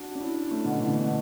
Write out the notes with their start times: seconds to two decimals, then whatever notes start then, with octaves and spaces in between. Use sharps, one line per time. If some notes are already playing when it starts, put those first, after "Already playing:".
Already playing: D4 F#4
0.15 D4
0.21 C#4 E4
0.51 A3 C#4
0.65 B2 D3
0.76 E3
0.80 B2 D3
0.96 B2